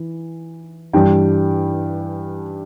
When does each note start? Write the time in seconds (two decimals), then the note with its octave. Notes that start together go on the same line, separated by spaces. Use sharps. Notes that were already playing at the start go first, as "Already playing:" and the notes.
Already playing: E3
0.93 G2 E3 G3 D4 G5